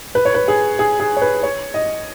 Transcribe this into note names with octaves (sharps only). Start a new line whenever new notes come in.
B4
C#5
B4
G#4
G#4
G#4
C#5
B4
C#5
D#5